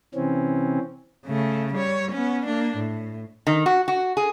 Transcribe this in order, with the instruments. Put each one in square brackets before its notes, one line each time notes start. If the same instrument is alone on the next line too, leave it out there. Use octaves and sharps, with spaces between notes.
[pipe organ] C3 E3 C4 C#4
[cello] C#3 A3
G3 C#5
B3 C#4
A#3 D4
A2
[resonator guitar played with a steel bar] D#3
F#4
F#4
G#4